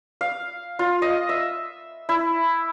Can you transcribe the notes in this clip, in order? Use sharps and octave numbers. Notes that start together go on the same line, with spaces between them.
F5
F4
D#5
E5
E4